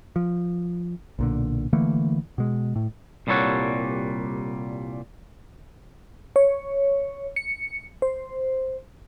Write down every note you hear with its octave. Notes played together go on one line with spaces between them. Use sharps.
F3
B1 A#2 D3
D3 E3 A3 A#3
B2 G#3
A2
C2 A#2 G3 A4 C#5 F#5
C#5
C#7
C5